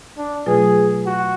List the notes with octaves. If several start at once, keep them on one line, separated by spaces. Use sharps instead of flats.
D4
B2 F#3 A3 F4 G#4 B4
F#4